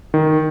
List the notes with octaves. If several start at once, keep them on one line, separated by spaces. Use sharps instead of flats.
D#3